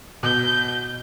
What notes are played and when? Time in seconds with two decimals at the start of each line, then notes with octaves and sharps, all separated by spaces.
0.23 B2 G6